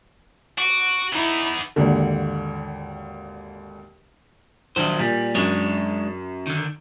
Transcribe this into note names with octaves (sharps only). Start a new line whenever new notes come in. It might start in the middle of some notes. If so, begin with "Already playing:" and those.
F#4 D6
E3 B3 D#4 E4
G#1 D#2 D3
A#1 D#3 F#3 C5 D#6
A#2 G3
F#2 G#3 D4 C#5
D3 D#3